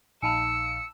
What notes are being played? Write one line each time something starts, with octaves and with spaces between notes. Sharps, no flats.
A#1 D#4 F5 G#5 A5 B5 E6 C#7